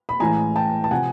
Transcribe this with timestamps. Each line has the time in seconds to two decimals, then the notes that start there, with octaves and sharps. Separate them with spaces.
0.09 B5
0.20 A1 A2 E3 G#3 G#5 A#5
0.56 G5 A5
0.84 A5
0.91 C3 F3 F#5 G#5